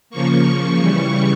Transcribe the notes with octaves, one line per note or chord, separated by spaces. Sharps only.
C#3 F3 A#3 C#6
C#3 E3 G3